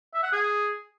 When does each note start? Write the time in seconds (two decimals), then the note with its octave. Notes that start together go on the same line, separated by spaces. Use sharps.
0.14 E5
0.23 F#5
0.32 G#4